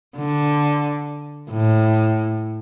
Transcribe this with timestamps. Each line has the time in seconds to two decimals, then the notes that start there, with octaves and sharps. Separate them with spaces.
0.17 D3
1.51 A2